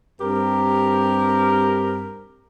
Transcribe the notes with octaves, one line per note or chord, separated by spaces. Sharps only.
G2 C4 G4 A#4